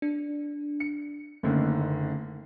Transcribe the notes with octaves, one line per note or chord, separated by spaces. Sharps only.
D4
C#7
F#1 D3 D#3 A3 A#3 C#4